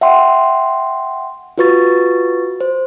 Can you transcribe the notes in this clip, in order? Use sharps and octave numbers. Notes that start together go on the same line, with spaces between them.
E5 F#5 G5 C6
F4 F#4 B4 C#6 A6
C5